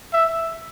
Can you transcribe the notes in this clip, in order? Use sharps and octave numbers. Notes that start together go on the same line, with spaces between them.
E5